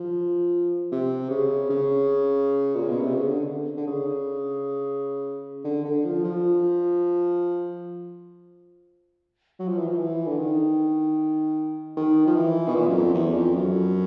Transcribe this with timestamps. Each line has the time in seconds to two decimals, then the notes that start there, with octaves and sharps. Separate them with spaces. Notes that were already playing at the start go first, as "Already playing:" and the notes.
Already playing: F3
0.92 C3
1.30 C#3
1.70 C#3
2.75 A#2
2.88 B2
3.01 C3
3.15 C#3
3.28 D3
3.77 D3
3.87 C#3
5.64 D3
5.85 D3
6.05 F3
6.24 F3
9.60 F#3
9.69 F3
9.78 E3
9.88 F3
9.98 E3
10.27 D3
10.38 D#3
11.97 D#3
12.27 F3
12.36 E3
12.69 B2
12.75 A#2
12.88 F#2
12.95 F2
13.14 E2
13.35 F2
13.54 F#2